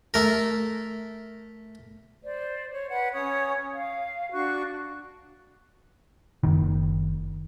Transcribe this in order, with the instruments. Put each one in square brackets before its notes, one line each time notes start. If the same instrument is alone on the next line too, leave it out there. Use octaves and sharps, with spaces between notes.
[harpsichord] A3 A#4
[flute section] C5 D5
C#5
B4 F#5
C#4 C#5 D#6
F5
D4 F#4 C#6
[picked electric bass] F#1 D#3